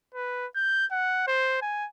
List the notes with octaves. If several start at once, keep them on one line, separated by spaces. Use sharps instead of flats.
B4
G6
F#5
C5
G#5